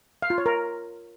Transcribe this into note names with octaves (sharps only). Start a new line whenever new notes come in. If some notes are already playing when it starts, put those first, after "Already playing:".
F5
F4
C#5
A#4